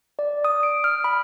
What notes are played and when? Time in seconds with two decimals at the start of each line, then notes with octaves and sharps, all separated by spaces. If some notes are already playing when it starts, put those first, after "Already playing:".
0.19 D5
0.45 D#6
0.63 D7
0.84 F6
1.04 B5